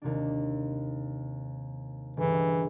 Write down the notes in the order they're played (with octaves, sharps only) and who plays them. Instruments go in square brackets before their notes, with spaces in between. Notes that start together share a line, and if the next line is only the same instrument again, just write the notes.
[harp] D#2 C3 D4
[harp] G1 C#2 [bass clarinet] E3